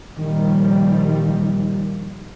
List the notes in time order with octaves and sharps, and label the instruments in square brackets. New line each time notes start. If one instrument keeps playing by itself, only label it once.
[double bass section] A#2 D#3 F3 G3